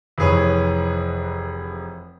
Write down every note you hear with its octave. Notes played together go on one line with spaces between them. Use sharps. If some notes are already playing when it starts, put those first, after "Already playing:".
F1 E3 G#4 B4 C#5